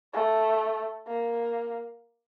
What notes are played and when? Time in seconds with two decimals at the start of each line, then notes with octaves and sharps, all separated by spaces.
0.14 A3
1.08 A#3